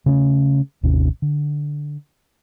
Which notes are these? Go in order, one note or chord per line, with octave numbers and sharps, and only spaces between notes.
C#3 A3 C#4
G#1 D#2 C3 C#4
D3